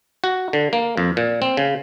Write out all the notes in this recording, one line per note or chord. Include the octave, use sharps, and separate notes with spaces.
F#4
D3
A#3
F2
A#2
C4
C#3